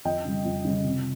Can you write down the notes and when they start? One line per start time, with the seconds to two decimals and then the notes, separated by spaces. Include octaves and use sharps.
0.05 F2 D#5 G5
0.25 C#3 G3
0.45 F2
0.65 C#3 G3
0.84 C3